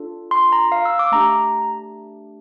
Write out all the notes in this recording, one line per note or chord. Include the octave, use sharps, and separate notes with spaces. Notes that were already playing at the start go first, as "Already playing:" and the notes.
Already playing: D4 F4 A4
C6
A#5
F5
E6
D6
A3 D4 G4 A#5